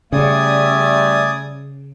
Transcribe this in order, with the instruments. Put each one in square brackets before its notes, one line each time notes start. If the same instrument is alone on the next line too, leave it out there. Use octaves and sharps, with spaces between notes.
[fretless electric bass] C#3 [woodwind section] G3 A3 [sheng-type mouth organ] D5 G#5 D#6 [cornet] E5